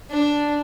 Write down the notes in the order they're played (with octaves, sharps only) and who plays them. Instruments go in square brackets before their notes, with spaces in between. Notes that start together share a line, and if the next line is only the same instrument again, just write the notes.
[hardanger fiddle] D4